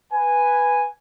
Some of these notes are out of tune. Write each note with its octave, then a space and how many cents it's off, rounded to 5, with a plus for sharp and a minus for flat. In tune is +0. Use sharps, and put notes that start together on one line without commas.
B4 +0 G#5 -5